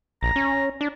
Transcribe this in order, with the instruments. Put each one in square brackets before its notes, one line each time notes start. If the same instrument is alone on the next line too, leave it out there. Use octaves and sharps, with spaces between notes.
[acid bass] A#1 [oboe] A#5
[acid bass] C#4
D4